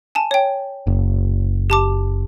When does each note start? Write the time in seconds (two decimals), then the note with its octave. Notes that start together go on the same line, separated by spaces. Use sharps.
0.15 G#5 A5
0.31 C#5 G5
0.87 F#1
1.70 G4 A5 D6